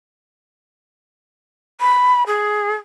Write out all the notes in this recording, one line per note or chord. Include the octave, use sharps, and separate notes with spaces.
B5
G#4